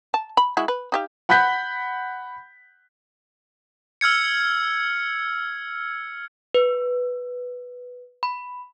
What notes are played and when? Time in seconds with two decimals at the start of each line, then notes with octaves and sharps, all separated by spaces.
0.14 A5
0.37 B5
0.57 G#3 E4 F#4
0.68 B4
0.92 D#4 G4 F5
1.29 F#5 B5 F#6 G6 B6
4.01 E6 F6 G#6 C#7
6.54 B4
8.23 B5